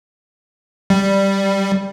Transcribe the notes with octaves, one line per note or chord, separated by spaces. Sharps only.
G3